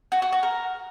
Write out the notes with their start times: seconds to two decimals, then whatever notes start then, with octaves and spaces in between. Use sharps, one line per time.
0.12 F#4
0.22 F#4
0.32 F#4
0.43 A#4